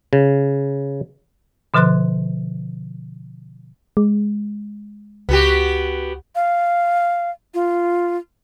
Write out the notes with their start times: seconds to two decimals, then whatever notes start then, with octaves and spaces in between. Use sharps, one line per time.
0.13 C#3
1.74 B2 D3 F3 B4 C6 F#6
3.97 G#3
5.29 C#2 B3 F#4 G4
6.35 F5
7.54 F4